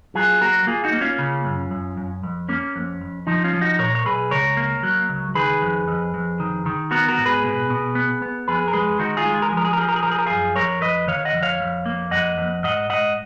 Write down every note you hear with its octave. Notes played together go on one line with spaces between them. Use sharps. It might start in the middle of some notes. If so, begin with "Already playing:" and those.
F#3 F4 G#4
A#3 F#4 A#4
A#3 F4 G#4
D#4 F#4
A#3
C#4 F4
C#3
F#2
F#2
F#2
F2
A#3 C#4
F2
F2
F3 D#4
C#4 F4
F3
D#4 F#4
A#2 A#4 C#5
C#5
B1 G#4 B4
C#2 A#4 C#5
A#3
F#3
C#2
D#3 G#4 B4
F2
F2
F2
D#3
D#3
B3 F#4 A#4
F#4 A#4
G#2
G#4 B4
B2
B2
B3
B3
F2 G#4 B4
A#4
G#3 G#4 B4
D#3 D#4 F#4
F4 G#4
G#3
G#4
A#4
G#4
F3 A#4
G#4
A#4
F3 G#4
A#4
G#4
F3 A#4
G#4
A#4
F#2 F4 G#4
F2 A#4 C#5
F2 B4 D#5
D#3 C#5 F5
D#5 F#5
F2
C#5 F5
F2
A#3
F2 D#5 F#5
F2
G#2 D#5 F#5
G#2 D#5 F#5